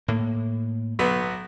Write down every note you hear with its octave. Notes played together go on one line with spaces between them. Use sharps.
A2 A#3
B1 F#3 B3